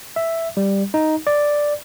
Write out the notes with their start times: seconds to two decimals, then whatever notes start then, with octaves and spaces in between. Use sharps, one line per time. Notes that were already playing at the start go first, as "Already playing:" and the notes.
0.16 E5
0.57 G3
0.94 D#4
1.27 D5